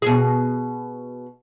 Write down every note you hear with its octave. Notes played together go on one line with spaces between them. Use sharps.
B2 G#4